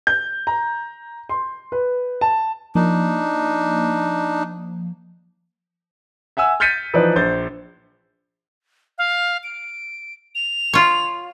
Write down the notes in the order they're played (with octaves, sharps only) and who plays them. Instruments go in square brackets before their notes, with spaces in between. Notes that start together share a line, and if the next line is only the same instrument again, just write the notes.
[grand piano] G6
A#5
C6
B4
A5
[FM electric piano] F3 A#3 [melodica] D4 D#4
[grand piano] E5 F#5 G#5 E6
F6 G6 A6 B6 C#7 D#7
E3 F3 D#4 B4 D5
A#1 C5 G6 A6
[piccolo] F5
D7
F7
[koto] F4 C#5